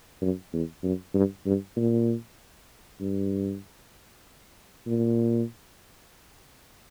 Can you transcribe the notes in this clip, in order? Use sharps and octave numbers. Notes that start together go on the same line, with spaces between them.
F#2
E2
F#2
G2
G2
A#2
G2
A#2